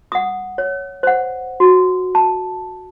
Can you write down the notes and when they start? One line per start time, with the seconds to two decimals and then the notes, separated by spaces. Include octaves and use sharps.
0.12 F#5 D#6
0.58 C#5
1.03 C5 F#5
1.60 F#4
2.15 A5